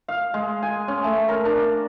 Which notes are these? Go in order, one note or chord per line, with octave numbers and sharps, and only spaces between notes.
F5
G#3
G#5
C#4
A3
A#4
D4